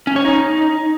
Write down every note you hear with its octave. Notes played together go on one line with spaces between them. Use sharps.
C#4
C#5
D#4